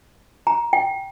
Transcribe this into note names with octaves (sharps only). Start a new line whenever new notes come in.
A#5
G5